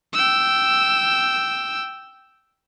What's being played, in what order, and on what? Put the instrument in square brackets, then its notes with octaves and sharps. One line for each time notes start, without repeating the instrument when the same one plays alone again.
[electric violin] G5 E6